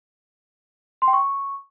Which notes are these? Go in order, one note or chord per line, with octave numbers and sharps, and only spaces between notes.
C6
G5
C#6